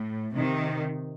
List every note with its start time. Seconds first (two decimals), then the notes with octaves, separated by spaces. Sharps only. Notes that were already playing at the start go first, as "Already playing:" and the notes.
Already playing: A2
0.35 C3 D#3